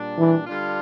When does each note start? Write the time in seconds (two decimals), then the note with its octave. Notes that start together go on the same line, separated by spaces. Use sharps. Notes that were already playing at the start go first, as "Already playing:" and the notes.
Already playing: A#2 G3 D4
0.18 E3
0.46 D3 G3 D4 F4